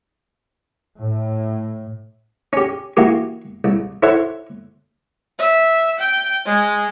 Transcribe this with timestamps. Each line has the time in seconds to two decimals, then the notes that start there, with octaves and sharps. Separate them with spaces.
0.99 A2
2.53 C#4 G4
2.97 E3 A#3 F#4 G4 D6
3.64 C2
4.03 E4 A4 C5 C#5 F#5
5.39 E5
6.00 G5
6.46 G#3